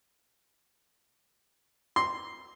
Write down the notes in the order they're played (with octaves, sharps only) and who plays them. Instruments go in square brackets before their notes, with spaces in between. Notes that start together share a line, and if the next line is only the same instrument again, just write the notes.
[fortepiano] C6